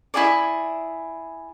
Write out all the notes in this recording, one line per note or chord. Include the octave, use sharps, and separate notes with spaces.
E4 F4 G#4 D5